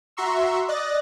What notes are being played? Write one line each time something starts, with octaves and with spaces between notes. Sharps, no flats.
F#4 E5 A#5 C6 C#6 E6
D5 D#5 F#6 A6 A#6